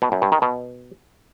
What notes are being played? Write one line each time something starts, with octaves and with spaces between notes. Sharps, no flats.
B2
F#2
G2
D#3
B2